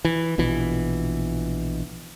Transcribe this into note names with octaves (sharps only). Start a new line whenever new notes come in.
E3
A#1 B2 E3